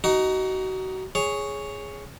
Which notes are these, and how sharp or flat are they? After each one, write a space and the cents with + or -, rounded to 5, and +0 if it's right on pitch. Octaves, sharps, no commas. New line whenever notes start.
D#4 +5 F#4 +30
G#4 +0 C#5 +5